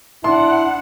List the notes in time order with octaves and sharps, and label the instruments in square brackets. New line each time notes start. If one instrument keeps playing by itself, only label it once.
[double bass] D4 [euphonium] E4 [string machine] F#5 [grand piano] C6